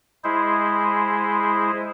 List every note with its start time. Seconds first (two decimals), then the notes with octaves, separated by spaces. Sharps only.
0.24 G#3 E4 G#4 C5